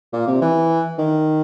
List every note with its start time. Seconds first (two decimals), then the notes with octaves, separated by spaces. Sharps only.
0.13 A#2
0.27 C3
0.41 E3
0.98 D#3